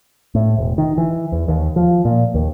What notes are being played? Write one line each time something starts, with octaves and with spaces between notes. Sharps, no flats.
A2
E1
D#3
E3
E2
D#2
F3
A#2
D#2